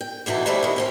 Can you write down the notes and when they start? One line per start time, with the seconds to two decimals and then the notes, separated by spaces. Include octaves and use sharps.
0.01 G5
0.26 E2 B2 E3 D#4 A4
0.46 A2 G3 A3 E4 B4 C5
0.63 A2 D#3
0.76 C4 C#4 E4